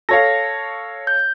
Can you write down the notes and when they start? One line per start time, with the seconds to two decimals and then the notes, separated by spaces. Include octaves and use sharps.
0.09 A4 C#5 F5 A#6
1.07 G6